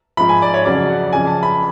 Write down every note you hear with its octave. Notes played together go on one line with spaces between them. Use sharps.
G#2 F3 B5
G#5
D5
C#5
F2 C#3 F#3 D5
F#5
F2 C#3 F3 G#5
A5
B5